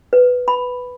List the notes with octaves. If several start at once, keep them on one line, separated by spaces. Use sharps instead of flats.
B4
B5